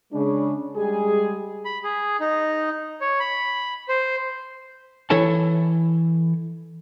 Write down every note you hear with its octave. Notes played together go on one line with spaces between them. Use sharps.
C#3 G#3 D4
G3 G#3 G4 G#4
B5
G#4
D#4
C#5
B5
C5
E3 E4 A4 C#5 A5